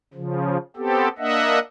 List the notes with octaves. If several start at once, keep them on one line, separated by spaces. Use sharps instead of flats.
C#3 F3
B3 C4 G4 A4
A#3 D4 D#5 E5 F#5